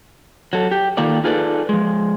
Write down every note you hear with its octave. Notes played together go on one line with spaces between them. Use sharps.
F#3 A4
G4
D#3 A#3 F4 A4 D5
D#4 F4 G#4 A4 B4 D5
F3 G#3